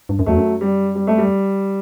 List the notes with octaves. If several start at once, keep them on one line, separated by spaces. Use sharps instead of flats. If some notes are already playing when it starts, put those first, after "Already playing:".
G2
F#2
E2 F#3 A3
F#2
G3
G3
A3
G3